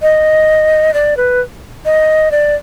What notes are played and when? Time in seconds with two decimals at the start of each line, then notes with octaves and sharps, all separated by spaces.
0.02 D#5
0.94 D5
1.17 B4
1.85 D#5
2.31 D5